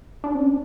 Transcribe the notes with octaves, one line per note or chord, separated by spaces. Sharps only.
D4
C4
C#4